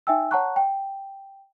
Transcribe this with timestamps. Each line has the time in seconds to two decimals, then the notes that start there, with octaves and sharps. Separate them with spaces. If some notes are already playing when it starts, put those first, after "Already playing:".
0.07 D#4 E5 G5 G#5 E6
0.31 C#5 F#5 A5 A#5 C#6 F#6
0.56 G5